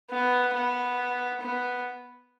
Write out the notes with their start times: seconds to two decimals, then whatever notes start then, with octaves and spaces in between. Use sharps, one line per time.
0.10 B3
0.53 B3
1.41 B3